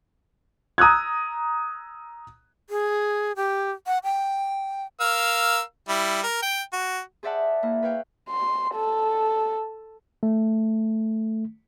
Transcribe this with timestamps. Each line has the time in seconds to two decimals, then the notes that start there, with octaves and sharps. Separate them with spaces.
0.78 A#5 D#6 E6 F#6 G#6
2.70 G#4
3.36 G4
3.87 F#5
4.04 G5
5.00 A#4 F5 E6
5.89 G3 E4
6.23 A#4
6.43 G5
6.73 F#4
7.23 G#4 C5 D5 E5 F#5 A5
7.63 A#3 E4
7.82 B4 C#5 F5 G5
8.29 C6
8.75 A4
10.23 A3